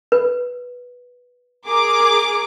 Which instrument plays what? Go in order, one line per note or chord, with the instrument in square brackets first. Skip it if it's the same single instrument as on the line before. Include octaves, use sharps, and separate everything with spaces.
[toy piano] B4
[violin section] G#4 A#4 D6